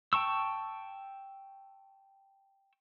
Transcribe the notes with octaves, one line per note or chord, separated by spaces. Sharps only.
G5 A5 C#6 E6